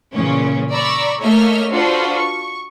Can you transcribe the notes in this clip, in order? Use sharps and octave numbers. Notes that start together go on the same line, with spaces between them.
A#2 C#3 E3 C#4
D5 A#5 B5 C#6 E6
A3 A#3 C#5 D#5 E5 F6
D4 F4 F#4 A4 B4 C5
C#6